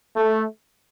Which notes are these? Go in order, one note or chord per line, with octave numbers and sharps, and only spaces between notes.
A3